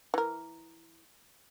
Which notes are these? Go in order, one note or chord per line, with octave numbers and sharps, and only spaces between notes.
E3 A#4